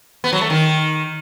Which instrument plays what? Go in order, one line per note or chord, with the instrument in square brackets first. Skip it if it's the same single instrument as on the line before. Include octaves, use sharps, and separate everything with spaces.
[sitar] B3
F#3
A3
D#3